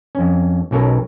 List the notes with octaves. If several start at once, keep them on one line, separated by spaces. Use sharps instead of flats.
F2 C#4
B1 B2 C#4 A4 A#4